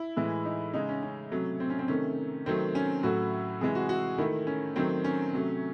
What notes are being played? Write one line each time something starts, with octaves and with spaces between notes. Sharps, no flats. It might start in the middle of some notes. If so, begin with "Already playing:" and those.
Already playing: E4
A2 E3 G#3
D#4
C#3 G#3 D#4
C#4
C#4
C3 F#3 A3
C4
C#4
C4
C3 D#3 A3 C#4
C3 D#3 F#3 A3 C4
C#4
A2 F#3 A3 F#4
C3 E3 G#3 G#4
F#4
F#4
D#3 A3 E4
C#4
D#3 F#3 A3 C4
C#4
C3 F#3 A3